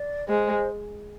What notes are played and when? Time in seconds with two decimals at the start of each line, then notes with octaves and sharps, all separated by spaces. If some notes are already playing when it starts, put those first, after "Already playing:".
Already playing: D5
0.28 G#3 C5